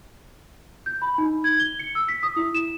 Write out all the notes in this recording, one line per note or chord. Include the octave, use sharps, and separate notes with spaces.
G6
B5
D#4
G#6
G7
C#7
E6
B6
D#6
E4
E7